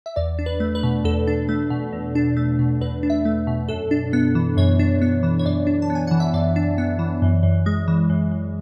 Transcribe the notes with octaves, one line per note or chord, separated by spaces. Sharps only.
E5
E2 D5
D4
B4
A3
B4
B2
E2 A4
D4
A3
B2
E2
D4
A3
B2
E2 B4
D4
E5
A3
B2
F#2 A4
D4
B3
E3
F#2 C#5
D4
B3
E3
C#5
F#2 D5
D4
A5
B3
G#5
E3 F#5
E5
F#2 D5
D4
B3
E3
F#2
F#2
G#3
E3
F#2
F#2